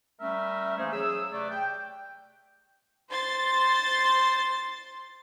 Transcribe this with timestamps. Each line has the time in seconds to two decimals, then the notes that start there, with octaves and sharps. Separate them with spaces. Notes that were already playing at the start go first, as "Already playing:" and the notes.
0.20 G3 A3 C#4 A#4 E5
0.78 E3 A3 A#3 D#4 G#4 C5
0.91 F#3 G#4 C#5 E6
1.33 C3 A3 B4 D5
1.50 G5
3.10 C5 C6 A6